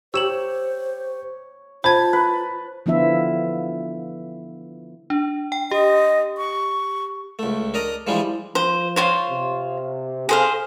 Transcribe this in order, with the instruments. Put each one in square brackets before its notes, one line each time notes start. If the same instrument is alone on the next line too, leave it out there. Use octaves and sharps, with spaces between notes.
[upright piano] G4 [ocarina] C5 [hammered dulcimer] C#5 [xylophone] E6 E7 F#7
[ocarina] F4 [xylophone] C5 G#6 [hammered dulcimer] A5 [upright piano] B5
[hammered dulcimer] B4
[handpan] D3 F3 B3 E4 F4 E5
[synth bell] D4
G5
[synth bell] G4 [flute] D#5
[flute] C#6
[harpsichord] C#2 A3
D4 A#4 D#5 A#5
E3 F3 G3 G#3 D4
[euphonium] F3 [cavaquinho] C5
[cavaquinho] F4 C5 C#5
[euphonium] C3
[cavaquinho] G#4 C5 F5 [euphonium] A4